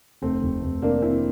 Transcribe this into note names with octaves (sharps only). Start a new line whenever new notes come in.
F1 A3 C4
F1
F1
C3 A#3 D4
C3 C4 E4